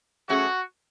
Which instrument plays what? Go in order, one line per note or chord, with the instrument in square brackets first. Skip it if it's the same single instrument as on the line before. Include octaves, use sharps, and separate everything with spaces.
[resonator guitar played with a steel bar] F#3 A3 C#4 G#4 [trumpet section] F#4